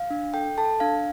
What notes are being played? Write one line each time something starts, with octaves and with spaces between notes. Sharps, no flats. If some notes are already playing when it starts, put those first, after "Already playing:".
Already playing: F5
D4
A4 G5
A4 A5
D4 F5